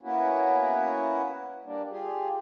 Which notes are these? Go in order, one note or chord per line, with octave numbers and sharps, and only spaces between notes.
A#3 B3 C#4 E4 F#4
G3 A#3 D4
F4 G4 G#4